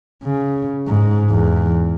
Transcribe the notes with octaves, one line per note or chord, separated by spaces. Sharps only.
C#3
G#2
E2